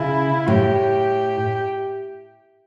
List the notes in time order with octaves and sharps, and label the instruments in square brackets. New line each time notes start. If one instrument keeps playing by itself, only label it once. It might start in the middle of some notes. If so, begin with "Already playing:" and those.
Already playing: [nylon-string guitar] C#3 [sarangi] E4
[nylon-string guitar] A2 [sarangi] G4